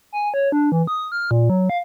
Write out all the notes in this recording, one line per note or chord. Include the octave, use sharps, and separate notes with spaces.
G#5
C#5
D4
E3
D#6
F6
A#2
F#3
F5